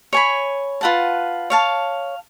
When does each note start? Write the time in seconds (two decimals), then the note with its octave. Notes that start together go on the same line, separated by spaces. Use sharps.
0.13 C#5 G#5 B5
0.81 F4 B4 F#5 A5
1.50 C#5 F5 A5